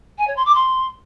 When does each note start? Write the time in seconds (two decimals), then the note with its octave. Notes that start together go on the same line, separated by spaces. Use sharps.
0.18 G#5
0.27 C#5
0.36 C6
0.45 D6
0.54 C6